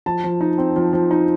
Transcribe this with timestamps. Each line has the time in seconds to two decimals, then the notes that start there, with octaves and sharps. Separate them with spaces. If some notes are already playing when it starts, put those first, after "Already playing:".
0.06 F3 A5
0.24 F3
0.41 D#4
0.58 C4
0.76 F3
0.93 F3
1.11 D#4